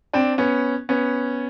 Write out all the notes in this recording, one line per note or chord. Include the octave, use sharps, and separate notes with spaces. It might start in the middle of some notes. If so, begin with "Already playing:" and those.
C4 D4
B3 C#4
B3 C#4